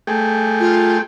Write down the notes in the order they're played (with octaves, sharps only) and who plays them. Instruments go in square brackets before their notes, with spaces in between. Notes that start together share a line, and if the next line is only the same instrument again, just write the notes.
[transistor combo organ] A3 G#4 G5
[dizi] F4